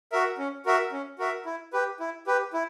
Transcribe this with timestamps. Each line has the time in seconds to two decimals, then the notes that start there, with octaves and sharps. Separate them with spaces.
0.12 F#4 A#4 E5
0.38 C#4
0.66 F#4 A#4 E5
0.92 C#4
1.19 F#4 A#4 E5
1.46 E4
1.73 G4 B4
2.00 E4
2.27 G4 B4
2.53 E4